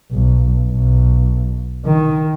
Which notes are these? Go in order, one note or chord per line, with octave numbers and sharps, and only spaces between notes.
B1
B1
D#3